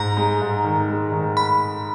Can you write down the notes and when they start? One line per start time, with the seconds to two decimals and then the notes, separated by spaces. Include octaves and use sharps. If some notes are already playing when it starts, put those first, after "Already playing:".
Already playing: G#2 A#5
0.17 G#3
0.41 G#2
0.64 D#3
0.88 G#3
1.12 D#3
1.37 B5